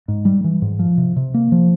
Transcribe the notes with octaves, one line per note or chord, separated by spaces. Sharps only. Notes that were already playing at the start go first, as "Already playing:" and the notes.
G#2
G3
E3
G#2
F3
C3
C3
A#3
F3